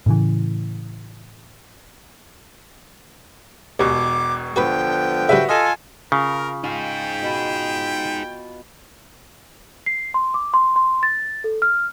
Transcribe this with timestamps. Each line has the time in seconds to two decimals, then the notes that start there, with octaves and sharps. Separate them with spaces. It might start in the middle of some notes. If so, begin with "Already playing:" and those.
0.06 A2 C#3 E3
3.80 E1 D#2 B2 D6
4.56 D3 F3 B3 F#4 B4 G5 B5
5.29 C#3 G3 F#4 B4 E5
5.49 F4 A4 D#5 G#5
6.12 C#3 F4 A#4
6.64 D#4 F4 G#4 G5
7.22 B2 B5
9.86 C7
10.14 C6
10.34 D6
10.54 C6
10.76 C6
11.03 A6
11.44 A4
11.62 F6